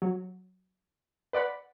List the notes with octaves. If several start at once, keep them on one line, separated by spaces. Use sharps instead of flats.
F#3
B4 D5 F#5 B5